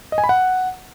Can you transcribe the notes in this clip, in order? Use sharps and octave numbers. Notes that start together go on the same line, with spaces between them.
D#5
G#5
B5
F#5